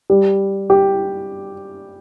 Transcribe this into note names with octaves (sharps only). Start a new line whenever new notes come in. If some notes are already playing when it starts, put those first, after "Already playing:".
G3
G4